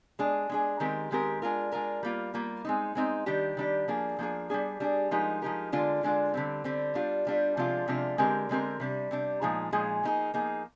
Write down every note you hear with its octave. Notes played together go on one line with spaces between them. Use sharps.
G#3 D4 G#4
G#3 D4 G#4
D#3 G#3 C4 G4 A#4
D#3 G#3 C4 G4 A#4
G#3 D4 F4 A#4
G#3 D4 F4 A#4
G3 A#3 F4
G3 A#3 F4
G#3 C4 D#4
G#3 C4 D#4
D#3 G3 D4 G4
D#3 G3 D4 G4
F3 A#3 D4 G#4
F3 A#3 D4 G#4
G3 D4 G#4
G3 D4 G#4
F3 G#3 D#4 G4 A#4
F3 G#3 D#4 G4 A#4
D3 G#3 D4 F4
D3 G#3 D4 F4
D3 G3 C4
D3 G3 C4
G3 D4 F4
G3 D4 F4
C3 F3 G#3 D4 F4
C3 F3 G#3 D4 F4
D3 G#3 C4 G4 A#4
D3 G#3 C4 G4 A#4
C3 G3 D4
C3 G3 D4
A#2 F3 G#3 D#4 G#4
A#2 F3 G#3 D#4 G#4
F3 A#3 D#4 G#4
F3 A#3 D#4 G#4